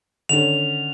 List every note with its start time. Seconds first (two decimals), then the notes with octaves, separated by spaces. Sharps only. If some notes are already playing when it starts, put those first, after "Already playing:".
0.29 D3 D#3 C#4 F7